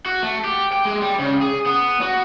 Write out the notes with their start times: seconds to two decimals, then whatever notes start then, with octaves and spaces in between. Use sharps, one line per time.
0.06 F#4
0.23 A3
0.44 G4
0.72 G5
0.85 G#3
1.02 G3
1.19 C#3
1.41 G#4
1.66 B3
2.01 F#4